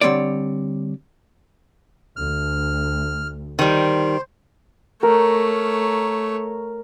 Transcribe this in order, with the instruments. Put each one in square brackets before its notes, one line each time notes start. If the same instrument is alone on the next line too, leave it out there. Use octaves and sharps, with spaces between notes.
[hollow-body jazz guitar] D3 G3 C4 C#5 D5
[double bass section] D2 [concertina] F6
[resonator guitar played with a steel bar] D#3 G3 [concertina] C5
[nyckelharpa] A3 C#5 [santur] A#4